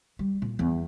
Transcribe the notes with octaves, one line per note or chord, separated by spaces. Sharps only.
G3
A#2
E2